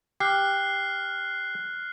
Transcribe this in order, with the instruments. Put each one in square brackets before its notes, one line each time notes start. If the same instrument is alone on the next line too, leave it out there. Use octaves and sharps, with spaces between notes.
[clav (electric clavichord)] G4 [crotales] F6 F#6 C7